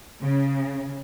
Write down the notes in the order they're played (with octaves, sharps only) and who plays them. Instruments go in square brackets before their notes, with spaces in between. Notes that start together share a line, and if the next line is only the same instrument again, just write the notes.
[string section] C#3